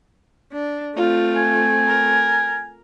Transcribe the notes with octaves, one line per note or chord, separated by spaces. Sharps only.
D4
A3 C4 F4
G#5
A#4